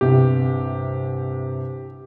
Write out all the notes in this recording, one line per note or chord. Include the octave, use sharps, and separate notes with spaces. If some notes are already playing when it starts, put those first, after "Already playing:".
G1 C2 C3 G4